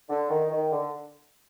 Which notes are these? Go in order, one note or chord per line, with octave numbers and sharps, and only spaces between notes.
D3
D#3
D#3
D3